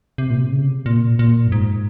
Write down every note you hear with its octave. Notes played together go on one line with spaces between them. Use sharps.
C3
A#2
C3
C#3
C3
A#2
A#2
F#2
G#2